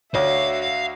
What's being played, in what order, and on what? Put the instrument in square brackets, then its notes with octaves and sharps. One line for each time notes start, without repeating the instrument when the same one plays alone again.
[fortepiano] D2 [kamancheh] F#4 E5 [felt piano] C#5 [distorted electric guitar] F5